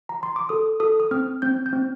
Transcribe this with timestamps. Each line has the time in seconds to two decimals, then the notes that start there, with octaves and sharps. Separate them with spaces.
0.09 A#5
0.23 C6
0.36 D6
0.49 A4 D#6
0.80 A4 D#6
1.00 D#6
1.11 C4 F6
1.42 C4 G6
1.66 G6
1.73 C4